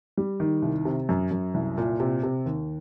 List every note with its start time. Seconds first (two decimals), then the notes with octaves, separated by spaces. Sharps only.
0.17 G3
0.40 D#3
0.62 C2
0.85 C3
1.09 F#2
1.31 F#2
1.54 C2
1.78 A#2
2.00 C3
2.23 C3
2.46 D#2